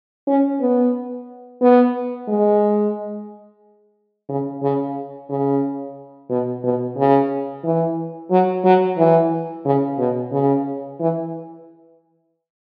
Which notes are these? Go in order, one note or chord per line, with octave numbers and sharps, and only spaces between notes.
C#4
B3
B3
G#3
C#3
C#3
C#3
B2
B2
C#3
E3
F#3
F#3
E3
C#3
B2
C#3
E3